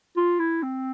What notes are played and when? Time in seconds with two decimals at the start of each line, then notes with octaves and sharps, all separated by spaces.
0.16 F4
0.39 E4
0.63 C4